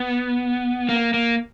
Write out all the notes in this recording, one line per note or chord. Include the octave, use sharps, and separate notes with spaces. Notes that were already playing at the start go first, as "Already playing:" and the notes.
Already playing: B3
A#3
A#3